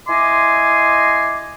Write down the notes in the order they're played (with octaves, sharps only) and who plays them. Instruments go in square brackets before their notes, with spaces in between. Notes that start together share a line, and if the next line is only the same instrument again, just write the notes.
[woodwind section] E4 D#5 G#5 C6 D6